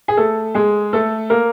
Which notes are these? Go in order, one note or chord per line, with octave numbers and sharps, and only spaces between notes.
G#4
A3 A4
G#3 G#4
A3 A4
A#3 A#4